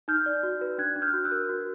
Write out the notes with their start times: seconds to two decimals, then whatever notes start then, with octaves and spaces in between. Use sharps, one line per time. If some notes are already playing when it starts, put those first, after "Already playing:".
0.08 D#4 F6 G6
0.26 D5
0.43 F#4
0.61 B4
0.78 D4 F#6 G#6
0.96 D4
1.02 F6 G6
1.13 F#4
1.25 E6 F#6
1.31 A#4
1.49 F#4